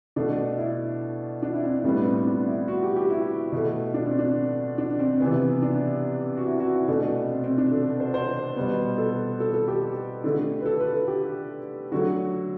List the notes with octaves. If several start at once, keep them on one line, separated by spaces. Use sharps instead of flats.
B2 A3 D4
E4
D4
E4
C4
C4
A2 G3 B3 D4
C4
D4
E4
F#4
G4
G4
E4
B2 A3
D4
C4
D4
D4
C4
C3 E3 B3 C4
D4
F#4
E4
F#4
E4
B2 A3 D4
C4
C4
D4
A4
C5
C5
B2 G3 B3
A4
A4
A4
G4
D3 A3
B4
A4
B4
A4
G4
D3 F#3 A3 F#4